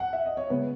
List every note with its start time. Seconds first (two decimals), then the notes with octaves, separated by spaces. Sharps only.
0.00 F#5
0.13 E5
0.26 D#5
0.37 C#5
0.50 C#3 G#3 B3 B4